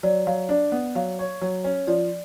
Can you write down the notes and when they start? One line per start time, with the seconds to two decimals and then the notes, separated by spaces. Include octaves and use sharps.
0.03 F#3 D5
0.27 F#3 F5
0.49 D4 D5
0.72 B3
0.95 F#3 F5
1.19 C#5
1.41 F#3
1.64 C#4
1.87 F3 D5